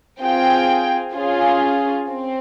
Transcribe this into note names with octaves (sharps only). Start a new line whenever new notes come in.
C4 F4 G#4 G5
C#4 F4 G#4
C4